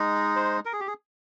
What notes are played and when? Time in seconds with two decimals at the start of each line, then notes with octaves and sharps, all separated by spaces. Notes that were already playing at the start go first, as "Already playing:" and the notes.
Already playing: G#3 D#4
0.36 C5
0.65 A#4
0.73 G#4
0.80 G4
0.87 G#4